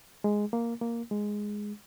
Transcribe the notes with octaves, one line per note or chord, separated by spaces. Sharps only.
G#3
A#3
A#3
G#3